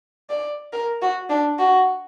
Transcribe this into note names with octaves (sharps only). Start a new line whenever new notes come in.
D5
A#4
F#4
D4
F#4